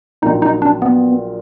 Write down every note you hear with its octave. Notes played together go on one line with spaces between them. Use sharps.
A#1 A#2 F#3 D#4
D#4
D4
B3